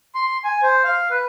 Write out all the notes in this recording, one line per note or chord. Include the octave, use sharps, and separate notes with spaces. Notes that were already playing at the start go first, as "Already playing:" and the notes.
C6
G#5
C5
F5
B4